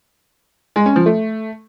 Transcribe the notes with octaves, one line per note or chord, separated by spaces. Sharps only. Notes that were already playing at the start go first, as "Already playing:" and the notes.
G#3
C#4
F3
A3